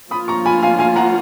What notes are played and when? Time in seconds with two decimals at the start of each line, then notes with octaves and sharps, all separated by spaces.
0.11 F3 A#3 F4 B5 D#6
0.28 A#5 C#6
0.46 G#5 B5
0.63 F5 G#5
0.79 F5 G#5
0.96 F#5 A#5